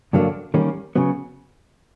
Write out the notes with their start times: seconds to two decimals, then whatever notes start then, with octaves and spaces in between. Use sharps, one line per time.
0.13 G2 D3 F#3 A#3 D4
0.54 D#3 G3 A#3 C#4
0.96 C#3 F#3 B3